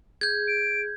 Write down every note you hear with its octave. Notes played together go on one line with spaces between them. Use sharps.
G#4 G6 G#6
D7